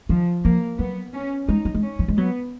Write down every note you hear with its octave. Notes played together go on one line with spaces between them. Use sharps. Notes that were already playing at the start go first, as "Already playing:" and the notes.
D#3 F3
F3 A#3
F#3 B3
C#4
G#3 D#4
F#3
G#3
C#4
F3
G#3
F#3 B3